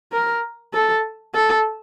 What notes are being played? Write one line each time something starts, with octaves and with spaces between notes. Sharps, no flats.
A#4
A4
A4